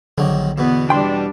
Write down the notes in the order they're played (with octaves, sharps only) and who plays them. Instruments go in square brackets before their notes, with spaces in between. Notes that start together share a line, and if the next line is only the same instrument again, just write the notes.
[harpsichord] A#1 D#3 F#3 [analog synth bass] D3
[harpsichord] E2 B2 [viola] B3
[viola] G3 D4 [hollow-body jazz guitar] G5 C6